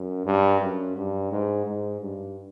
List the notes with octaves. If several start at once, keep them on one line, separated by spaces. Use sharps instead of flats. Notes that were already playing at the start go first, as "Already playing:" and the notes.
Already playing: F#2
G2
F#2
G2
G#2
G#2
G2